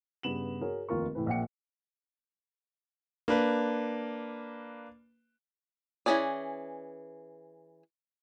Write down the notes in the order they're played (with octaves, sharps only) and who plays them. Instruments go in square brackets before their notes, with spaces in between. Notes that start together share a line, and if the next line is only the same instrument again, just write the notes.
[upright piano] G2 C#3 B3 E7 F#7
F#4 G#4 A#4 C#5
F1 D#2 F4 A#4 C#6
A2 C3 E3 B4
A#1 A#2 F#5 G5 C#7
[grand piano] A#3 D4 B4
[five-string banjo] E3 F#3 C#4 G#4 D5